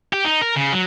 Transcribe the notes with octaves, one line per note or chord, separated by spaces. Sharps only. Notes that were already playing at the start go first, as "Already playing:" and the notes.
G4
D#4
A#4
C#3
F#3